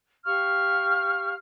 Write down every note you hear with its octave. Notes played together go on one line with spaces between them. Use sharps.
G4 F5 C#6 F6